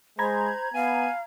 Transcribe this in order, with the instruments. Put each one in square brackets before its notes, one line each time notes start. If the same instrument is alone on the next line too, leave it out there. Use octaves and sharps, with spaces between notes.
[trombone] G#3 [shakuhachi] C5 [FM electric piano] A#5 B5 G#6
[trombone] B3 [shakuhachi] F5 [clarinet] G#5